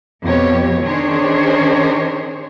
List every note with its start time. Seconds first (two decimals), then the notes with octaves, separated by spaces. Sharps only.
0.24 F2 B2 G4 C#5
0.83 D#3 C#4 D4 G#4 C5 C#5